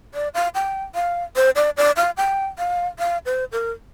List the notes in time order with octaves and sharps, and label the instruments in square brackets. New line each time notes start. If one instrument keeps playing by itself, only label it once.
[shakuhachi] D5
F5
G5
F5
C5
D5
D5
F5
G5
F5
F5
C5
A#4